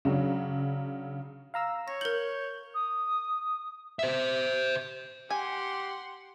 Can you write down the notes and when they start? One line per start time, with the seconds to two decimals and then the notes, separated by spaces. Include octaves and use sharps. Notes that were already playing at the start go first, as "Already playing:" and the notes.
0.05 C#3 F#3 D4 F#4
1.54 F5 A#5 E6
1.88 C#5 A#6
2.01 A#4 G6 F#7
2.74 D#6
3.99 C5 E5
5.30 G4 F#5 G#5 C6